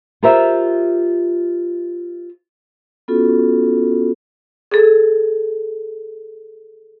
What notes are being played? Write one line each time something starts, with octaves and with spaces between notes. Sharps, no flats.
F4 G4 A#4 C5 E5
B3 C#4 F4 F#4 A4
G#4 A4